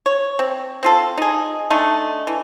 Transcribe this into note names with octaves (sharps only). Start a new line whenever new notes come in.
C#5
C4
C4 F4 A4
D#4 G#4
D3 A3 D#4
E3